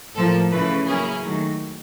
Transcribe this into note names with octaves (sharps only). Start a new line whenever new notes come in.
A2 F3 A#3 A4
C#3 E3 A3 B4
F#3 A#3 C#4 E4 G#4
D#3 F#3 A3